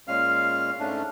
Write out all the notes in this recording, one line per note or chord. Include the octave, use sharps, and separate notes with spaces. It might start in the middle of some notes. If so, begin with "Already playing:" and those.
A#2 G#3 C#4 F5 F6
G#2 A3 C#4 D4